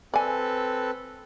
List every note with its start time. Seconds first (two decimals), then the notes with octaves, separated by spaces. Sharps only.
0.14 C4 A4 B4 D5 G#5